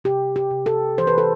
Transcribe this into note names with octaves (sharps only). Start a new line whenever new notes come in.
C3 G4
G4
C3
A4
E3 C5
B4
A4